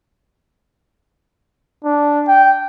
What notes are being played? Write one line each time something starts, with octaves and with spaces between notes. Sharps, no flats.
D4
G5